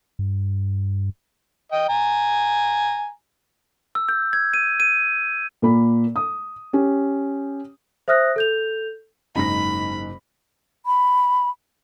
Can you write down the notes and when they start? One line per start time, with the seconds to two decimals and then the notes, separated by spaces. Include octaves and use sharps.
0.19 G2
1.72 D#5 G5
1.89 G#5 A#5
3.95 E6
4.09 G6
4.33 G#6
4.54 D#7
4.80 D#7
5.62 A#2 A#3 B5
6.16 D#6
6.73 C#4 G4
8.08 C5 E5 D#6 F6 F#6 A#6
8.36 A4 G6 F7
9.36 F#1 G#2 D#4 B5 A#6
10.86 B5